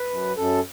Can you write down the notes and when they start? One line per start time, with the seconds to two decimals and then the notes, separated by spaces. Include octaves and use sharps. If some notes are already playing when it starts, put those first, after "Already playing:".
Already playing: B4
0.10 F#2
0.36 F#2 A4